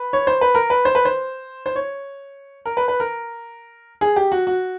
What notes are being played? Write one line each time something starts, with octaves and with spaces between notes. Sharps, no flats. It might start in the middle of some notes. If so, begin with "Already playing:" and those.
Already playing: B4
C#5
C5
B4
A#4
B4
C5
B4
C5
C5
C#5
A#4
B4
B4
A#4
G#4
G4
F#4
F#4